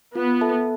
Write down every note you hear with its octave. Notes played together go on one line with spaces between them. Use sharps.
B3 F4
A4 E5 A5